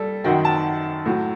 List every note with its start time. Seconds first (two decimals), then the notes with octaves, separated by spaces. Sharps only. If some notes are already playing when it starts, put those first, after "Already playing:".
Already playing: G3 A4
0.24 F#2 D#3 F#3 G5
0.45 A5
1.06 A2 F#3